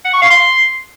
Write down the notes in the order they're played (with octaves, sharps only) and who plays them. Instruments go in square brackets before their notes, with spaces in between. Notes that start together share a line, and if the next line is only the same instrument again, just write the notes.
[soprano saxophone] F#5
C#6
F5
C6